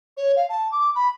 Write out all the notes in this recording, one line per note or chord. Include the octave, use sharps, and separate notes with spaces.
C#5
F5
A5
D6
B5